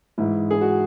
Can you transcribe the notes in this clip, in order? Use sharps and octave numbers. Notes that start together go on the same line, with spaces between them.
G#2 E3 G#3 E4
G#4
F#4